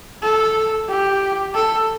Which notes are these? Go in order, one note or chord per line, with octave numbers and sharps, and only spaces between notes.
A4
G4
A4